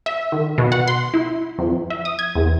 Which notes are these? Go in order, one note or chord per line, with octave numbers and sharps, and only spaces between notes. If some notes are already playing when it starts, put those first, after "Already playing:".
E5
D#3
B2
F#5
C6
E4
F2
E5
D#6
G#6
E2